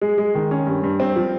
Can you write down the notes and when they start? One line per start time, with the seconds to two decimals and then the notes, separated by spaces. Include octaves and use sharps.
0.01 G#3
0.18 G#3
0.35 D#3
0.51 C#4
0.67 G2
0.83 G2
1.00 C4
1.16 F3